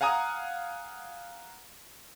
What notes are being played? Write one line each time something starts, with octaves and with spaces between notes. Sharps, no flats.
F5 F#5 G#5 A#5 D#6